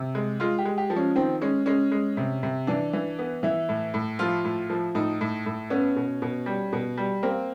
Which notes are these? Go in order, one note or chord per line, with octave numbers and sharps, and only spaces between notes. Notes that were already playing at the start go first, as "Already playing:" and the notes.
Already playing: C3
G#3
G#3 F4
G4
G#3
G4
F3
C#4
D#3 C4
G#3 C#4
G#3 C#4
G#3
C3
C3
E3 D4
E3
B3
E3 E4
A2
A2
F3 F4
A2
F3
A2 D#4
A2
A2
B3 C#4
B2
B2
G3
B2
G3
A#3 C4